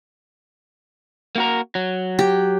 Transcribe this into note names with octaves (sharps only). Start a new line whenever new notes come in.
A#3 F#4 A#4
F#3
G4